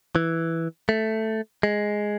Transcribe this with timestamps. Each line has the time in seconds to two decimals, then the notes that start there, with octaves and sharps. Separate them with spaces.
0.16 E3
0.89 A3
1.63 G#3